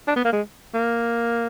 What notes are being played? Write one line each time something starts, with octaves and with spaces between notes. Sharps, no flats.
D4
B3
A#3
G#3
A#3